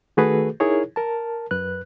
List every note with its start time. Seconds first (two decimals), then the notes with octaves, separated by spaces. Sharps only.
0.17 D#3 A3 F#4 G#4 A4 B4
0.60 D#4 E4 G#4 A#4 C#5
0.96 A#4 A5
1.51 F#2 B4 F#6